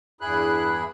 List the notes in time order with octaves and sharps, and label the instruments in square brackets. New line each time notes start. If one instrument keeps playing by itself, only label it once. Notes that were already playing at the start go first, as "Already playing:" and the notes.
[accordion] E2 G2 E4 G#4 B5 F#6